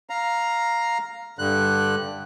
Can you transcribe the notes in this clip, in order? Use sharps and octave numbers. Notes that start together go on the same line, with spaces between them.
F5 A#5
G2 D3 F#6